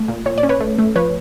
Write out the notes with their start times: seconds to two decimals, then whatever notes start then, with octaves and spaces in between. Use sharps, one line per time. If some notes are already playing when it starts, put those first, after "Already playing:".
Already playing: A3
0.08 A#2
0.26 A#2 C#5
0.38 D5
0.43 C#4
0.49 B4 C#5
0.60 A3
0.78 A3
0.95 F3 B4 C#5